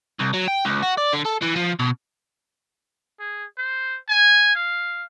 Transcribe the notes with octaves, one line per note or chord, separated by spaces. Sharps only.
C2
F#3
G5
C#2
F#4
D5
D3
A4
E3
F3
B2
G#4
C5
G#5
F5